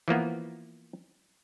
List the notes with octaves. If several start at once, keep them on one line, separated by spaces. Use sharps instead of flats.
E3 F3 A#3 B3